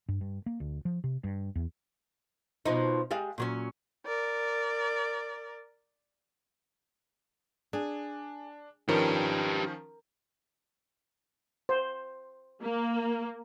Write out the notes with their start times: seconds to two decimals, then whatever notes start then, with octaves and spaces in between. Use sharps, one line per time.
0.08 G2
0.21 G2
0.46 A#3
0.60 D2
0.85 F3
1.04 C3
1.24 G2
1.55 E2
2.66 B2 F3 D#4
3.11 G3 G#3 F5
3.38 A#2 F#3 C#4
4.06 A#4 D5
7.73 D4 G#4
8.89 D#3 F3 C#4 G4 A#4 B4
11.69 C5
12.62 A#3